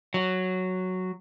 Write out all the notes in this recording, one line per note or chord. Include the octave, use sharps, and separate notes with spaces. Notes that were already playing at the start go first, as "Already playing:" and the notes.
F#3